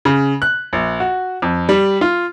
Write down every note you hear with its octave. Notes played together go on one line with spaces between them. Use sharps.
C#3
F#6
A#1
F#4
F2
G3
F4